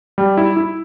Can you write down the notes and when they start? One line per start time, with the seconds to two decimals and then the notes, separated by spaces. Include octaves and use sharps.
0.18 G3
0.37 E4
0.57 E4